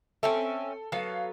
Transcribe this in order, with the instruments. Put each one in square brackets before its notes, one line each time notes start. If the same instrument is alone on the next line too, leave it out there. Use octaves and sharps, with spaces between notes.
[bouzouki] C4 C#4 E5 [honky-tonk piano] A4
[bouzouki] F#3 B3 A4 [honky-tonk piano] F5